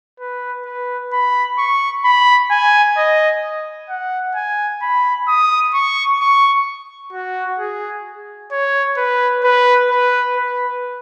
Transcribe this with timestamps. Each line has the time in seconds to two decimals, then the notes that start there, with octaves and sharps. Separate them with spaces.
0.20 B4
0.66 B4
1.13 B5
1.58 C#6
2.04 B5
2.51 G#5
2.98 D#5
3.89 F#5
4.35 G#5
4.82 B5
5.28 D#6
5.74 C#6
6.20 C#6
7.13 F#4
7.59 G#4
8.51 C#5
8.97 B4
9.44 B4
9.90 B4
10.36 B4